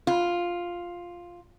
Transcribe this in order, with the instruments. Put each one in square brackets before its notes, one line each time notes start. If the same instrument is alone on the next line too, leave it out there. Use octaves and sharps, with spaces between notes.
[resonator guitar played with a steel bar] F4